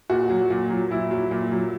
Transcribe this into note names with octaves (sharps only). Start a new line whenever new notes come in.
A#2 F#4
F#3
A#2
F#3
A#2 E4
F#3
A#2
F#3